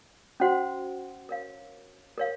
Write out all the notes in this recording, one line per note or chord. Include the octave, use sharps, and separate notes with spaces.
C#4 F#4 C5 F#5 C6
A#4 C#5 F5
A#4 C#5 F5